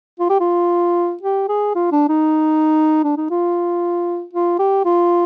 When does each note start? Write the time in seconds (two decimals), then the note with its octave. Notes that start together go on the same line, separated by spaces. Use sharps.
0.20 F4
0.30 G4
0.40 F4
1.23 G4
1.49 G#4
1.75 F4
1.92 D4
2.09 D#4
3.04 D4
3.17 D#4
3.31 F4
4.33 F4
4.59 G4
4.85 F4